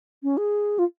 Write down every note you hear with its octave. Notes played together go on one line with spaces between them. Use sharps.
C#4
G#4
F4